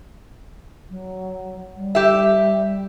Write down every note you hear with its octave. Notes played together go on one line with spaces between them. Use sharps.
F#3
G3
G4 E5